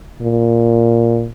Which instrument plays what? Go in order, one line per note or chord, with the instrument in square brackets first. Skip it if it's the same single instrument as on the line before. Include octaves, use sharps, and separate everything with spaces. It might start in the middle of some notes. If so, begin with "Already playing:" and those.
[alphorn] A#2